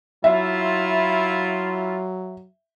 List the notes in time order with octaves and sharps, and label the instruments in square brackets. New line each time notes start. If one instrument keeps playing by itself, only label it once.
[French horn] F#3 [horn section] E4 F4 [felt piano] E5